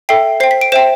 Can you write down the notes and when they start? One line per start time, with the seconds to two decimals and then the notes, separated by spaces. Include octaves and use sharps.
0.09 A4 E5 G5 C7
0.40 C5 C7
0.44 G5
0.51 B6
0.61 D7
0.72 C5 E5 G5 E7